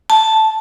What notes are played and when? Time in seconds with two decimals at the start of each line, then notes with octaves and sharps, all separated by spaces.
0.10 A5